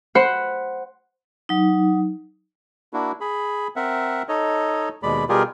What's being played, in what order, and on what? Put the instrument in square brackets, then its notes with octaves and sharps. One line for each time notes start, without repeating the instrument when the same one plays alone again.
[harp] C5 F#5 B5 F#6
[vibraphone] F#3 D#4
[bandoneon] A#3 D4 E4 F#4
G#4 B5
C4 A#4 E5 F#5
D#4 A4 C#5 D#5
D#2 B2 G#3 D5 B5
B2 G3 F4 G4 G#4 A#4